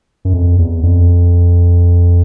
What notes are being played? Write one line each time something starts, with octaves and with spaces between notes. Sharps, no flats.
F#2
F2
E2
F2